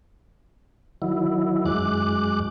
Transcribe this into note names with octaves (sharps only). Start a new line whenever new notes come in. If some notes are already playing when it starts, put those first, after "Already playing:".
D#3 F#3 E4
F#2 G#3 D6 F#6